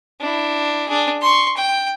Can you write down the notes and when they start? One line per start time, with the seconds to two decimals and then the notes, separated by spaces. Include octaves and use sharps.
0.20 D4 E4
0.88 D4 G#4
1.22 C6 C#6
1.57 G5